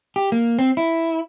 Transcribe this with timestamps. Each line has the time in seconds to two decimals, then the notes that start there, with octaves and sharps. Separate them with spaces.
0.16 G4
0.32 A#3
0.59 C4
0.77 E4